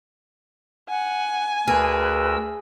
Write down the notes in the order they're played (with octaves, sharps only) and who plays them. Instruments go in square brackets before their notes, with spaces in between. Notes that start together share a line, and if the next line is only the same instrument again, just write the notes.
[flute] F#5 [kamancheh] G#5
[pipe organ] D2 A#4 E6 [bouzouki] G#4 [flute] B4